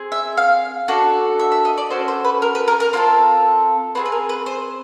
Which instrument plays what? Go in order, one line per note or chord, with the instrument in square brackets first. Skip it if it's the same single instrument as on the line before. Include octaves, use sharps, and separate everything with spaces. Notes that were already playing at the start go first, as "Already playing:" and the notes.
Already playing: [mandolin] C4 G#4
E5
F5
D4 F#4 A4
E5
E5
D#5
D5
C#4 F#4 A4 C5
C5
B4
A#4
B4
A#4
A#4
C4 F4 A4 A#4
C4 F4 G#4 B4
B4
A#4
B4
C5